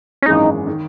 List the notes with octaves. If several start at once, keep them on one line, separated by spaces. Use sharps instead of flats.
C#4
G#1 F#2 E3 G#3 D#4
D#3